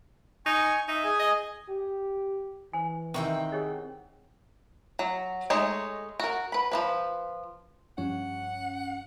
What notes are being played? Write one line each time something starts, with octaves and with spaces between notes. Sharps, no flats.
D#4 G#5 C#6
D#4 E5
G#4 G#5
D#5
G4
E3 C5 G#5
C3 D#3 E4 C5 F#5 G5 A#5 C#6
G4 G#4 C#5 D#5
F#3
G#3 A3 D#4 C#5
F#4 A#4
B4 B5
F3 A#3 B4
G2 F3 C#4 F#5